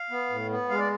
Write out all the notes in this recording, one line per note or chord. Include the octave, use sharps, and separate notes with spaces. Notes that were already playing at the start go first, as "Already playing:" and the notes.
Already playing: F5
B3
A2
B3
G#3 F5
D5